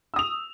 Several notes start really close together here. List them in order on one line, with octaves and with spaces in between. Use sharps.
E6 D#6 F7